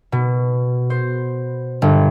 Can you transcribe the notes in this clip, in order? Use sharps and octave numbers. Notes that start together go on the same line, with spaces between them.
B2
C5
G1